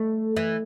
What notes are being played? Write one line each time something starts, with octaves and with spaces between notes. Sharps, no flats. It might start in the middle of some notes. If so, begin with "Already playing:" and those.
Already playing: A3
E3